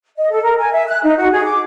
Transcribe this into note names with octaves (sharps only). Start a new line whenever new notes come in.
D#5
A4
A#4
G#5
E5
F#6
D#4
F#4
G#4
D6